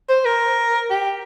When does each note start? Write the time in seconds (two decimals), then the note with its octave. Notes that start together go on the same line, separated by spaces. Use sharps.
0.09 C5
0.25 A#4
0.90 G4